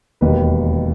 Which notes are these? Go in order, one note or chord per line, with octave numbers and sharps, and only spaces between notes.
E1 D#2 D#3 B4